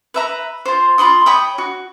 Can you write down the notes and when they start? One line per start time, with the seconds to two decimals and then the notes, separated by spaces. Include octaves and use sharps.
0.14 B4 E5 A#5
0.65 F4 C5
0.98 F4 B5 C6 D#6
1.26 C#5 G5 B5 D#6
1.58 F#4